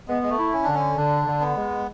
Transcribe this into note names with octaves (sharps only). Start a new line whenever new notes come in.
G#3 B3
G#3
A3
E4
C#4
D3 D4
C#4
D3 D4
D3
B3
G#3